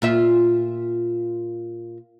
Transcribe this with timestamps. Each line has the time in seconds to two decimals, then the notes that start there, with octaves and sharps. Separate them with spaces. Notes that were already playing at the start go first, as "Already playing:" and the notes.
0.02 A#2 F4 E5